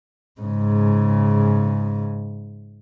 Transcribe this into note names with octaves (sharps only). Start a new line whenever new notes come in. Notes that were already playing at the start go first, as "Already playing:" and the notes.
G#2 C#3